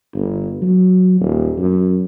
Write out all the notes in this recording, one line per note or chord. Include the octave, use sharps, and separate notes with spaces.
G1
F#3
D#1
F#2